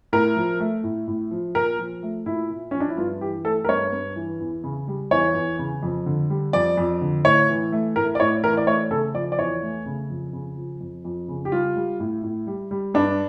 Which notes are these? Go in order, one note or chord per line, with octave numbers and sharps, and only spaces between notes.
A2 A#4
F3
A3
A2
A2
F3
A#2 A#4
F3
A3
A#2 E4
A#2
F3 C#4
D4
E4
G2 F4
E3 G4
A3 A4
A#4
G2 C#5
G2
E3
E2
C#3
G3
E2 C#5
E2
C#3
F2
D3
G3
F2 D5
F2
D3
A2 C#5
E3
A3
A2 A#4
D5
A2 C#5
E3 A#4
D5
A3 C#5
C#3 A4
F3 D5
D5
E2 C#5
A3
C#3
F2
C#3
F3
F2
F2
C#3
G4
G3 F4
G3
A2
A2
G3
G3
G2 D4